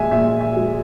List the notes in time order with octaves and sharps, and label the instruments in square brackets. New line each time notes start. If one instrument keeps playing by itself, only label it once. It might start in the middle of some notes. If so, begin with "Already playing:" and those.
Already playing: [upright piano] A#2 G#3 E5 G#5
A#2 E5
E5
G#3